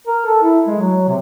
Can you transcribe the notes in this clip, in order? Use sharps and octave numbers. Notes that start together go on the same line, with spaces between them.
A#4
A4
E4
G#3
F#3
C3